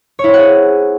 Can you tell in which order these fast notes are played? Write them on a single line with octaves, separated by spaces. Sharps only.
C#5 E4 C4 F#5 G#4